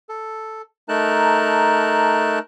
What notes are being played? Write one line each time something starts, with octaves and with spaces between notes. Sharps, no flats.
A4
A3 D#4 A#4 A5 F#6